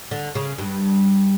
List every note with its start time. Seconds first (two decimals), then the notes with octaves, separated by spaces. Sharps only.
0.11 D3
0.35 C#3
0.58 G2